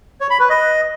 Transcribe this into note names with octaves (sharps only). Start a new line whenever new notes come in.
C#5
B5
B4
D#5